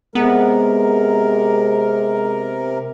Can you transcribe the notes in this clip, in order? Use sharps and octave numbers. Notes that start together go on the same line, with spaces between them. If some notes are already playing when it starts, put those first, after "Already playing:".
C3 G#3 B3 A#4